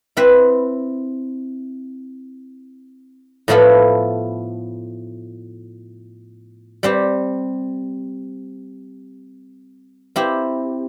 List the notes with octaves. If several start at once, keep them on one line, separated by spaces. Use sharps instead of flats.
C4 E4 B4 E5
A2 F3 B3 E4 A4
G3 C4 G4
C4 E4 G4